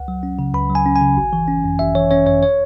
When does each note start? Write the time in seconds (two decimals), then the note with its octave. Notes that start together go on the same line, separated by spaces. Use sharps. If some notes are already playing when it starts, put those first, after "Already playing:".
Already playing: C#2 F#5
0.08 F#3
0.23 C#4
0.39 C#3
0.54 C#2 B5
0.70 F#3
0.75 G#5
0.86 C#4
0.96 G#5
1.02 C#3
1.17 G#1
1.33 E3
1.48 C#4
1.64 F#2
1.79 G#1 E5
1.95 E3 C#5
2.11 C#4 C#5
2.26 F#2 C#5
2.42 C#5